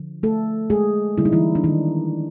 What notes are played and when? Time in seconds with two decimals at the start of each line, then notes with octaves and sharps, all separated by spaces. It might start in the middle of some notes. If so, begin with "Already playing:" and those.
Already playing: D3 F3
0.23 A3 A4
0.70 G#3 G#4
1.18 D3 G3 A#3 E4
1.25 D#4
1.32 E3 E4
1.55 D4
1.64 D#3 D#4